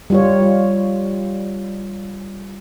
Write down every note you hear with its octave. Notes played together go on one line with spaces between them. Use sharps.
G3 F4 C#5